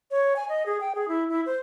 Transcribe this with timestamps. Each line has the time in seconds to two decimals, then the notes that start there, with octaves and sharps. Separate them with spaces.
0.11 C#5
0.36 G#5
0.49 D#5
0.66 G#4
0.81 G5
0.95 G#4
1.08 E4
1.29 E4
1.46 C5